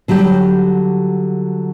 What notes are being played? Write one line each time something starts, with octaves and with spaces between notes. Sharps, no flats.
D3 F#3 G3 G4